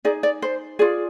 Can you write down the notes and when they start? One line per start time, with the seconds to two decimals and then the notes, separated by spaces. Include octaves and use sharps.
0.05 D#4 G#4 D5
0.23 D5
0.42 C5
0.79 F4 G#4 D5